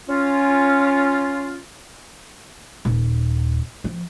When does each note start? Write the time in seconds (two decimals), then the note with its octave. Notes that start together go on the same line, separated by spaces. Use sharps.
0.08 C#4 F4
2.85 D#1
3.84 F3